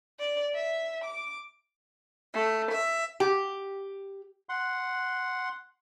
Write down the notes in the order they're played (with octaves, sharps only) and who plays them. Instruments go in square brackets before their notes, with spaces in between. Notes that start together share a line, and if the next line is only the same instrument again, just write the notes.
[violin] D5
E5
D6
[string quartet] A3
E5
[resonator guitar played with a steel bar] G4
[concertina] F#5 C6